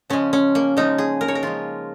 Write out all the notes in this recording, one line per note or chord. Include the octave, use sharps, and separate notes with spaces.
C#3 F3 G#3 C#4
C#4
A#3
C#3 F3 G#3 D#4
G#4
A#4
C#5
A#4
C#3 F3 G#3 F4